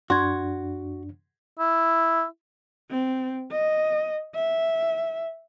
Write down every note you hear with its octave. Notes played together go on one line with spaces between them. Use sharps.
F#2 D4 F#4 C6 G#6
E4
C4
D#5
E5